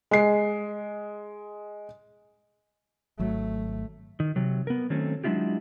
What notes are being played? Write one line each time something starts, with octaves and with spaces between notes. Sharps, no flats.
G#3 C7
G#1 F#3 A3
D#3
C3 F#3
B3 A#4
D#3 F#3 A3 C4 C#4
F#3 G#3 D4 E4 F4 G4